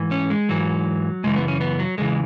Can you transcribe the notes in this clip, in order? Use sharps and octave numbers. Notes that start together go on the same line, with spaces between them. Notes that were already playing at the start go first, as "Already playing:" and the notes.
Already playing: G#2 E3
C#4
G#3
G#2 E3 F#3
F#2 C#3 E3 G#3
B3
C#4
B3
F#3
E2 C#3 E3 G#3